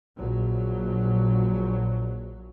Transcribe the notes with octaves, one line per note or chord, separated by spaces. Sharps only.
A#1 F#3